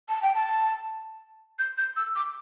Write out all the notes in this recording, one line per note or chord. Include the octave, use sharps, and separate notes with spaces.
A5
G5
A5
G6
G6
E6
D6